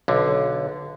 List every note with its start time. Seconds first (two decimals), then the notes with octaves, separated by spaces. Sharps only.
0.08 B1 D3